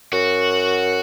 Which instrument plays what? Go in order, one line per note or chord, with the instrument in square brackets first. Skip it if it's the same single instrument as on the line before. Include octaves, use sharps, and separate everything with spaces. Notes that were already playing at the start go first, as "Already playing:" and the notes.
[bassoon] F#2 [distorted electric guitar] F#4